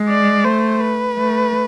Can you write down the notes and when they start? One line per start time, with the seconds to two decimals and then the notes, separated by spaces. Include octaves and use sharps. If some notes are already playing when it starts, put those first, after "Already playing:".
Already playing: G#3
0.09 D5
0.44 A3 C5
0.81 B4
1.17 A3